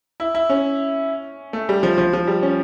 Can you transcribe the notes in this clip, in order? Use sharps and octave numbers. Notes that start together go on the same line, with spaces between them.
E4
E4
C#4
A3
G3
F3
F3
F3
G3
C#4